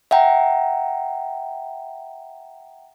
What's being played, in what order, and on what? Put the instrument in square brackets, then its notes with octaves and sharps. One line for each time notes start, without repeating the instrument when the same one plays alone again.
[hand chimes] E5 F#5 G5 A#5